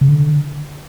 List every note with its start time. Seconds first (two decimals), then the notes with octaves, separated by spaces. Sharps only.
0.01 C#3
0.09 D3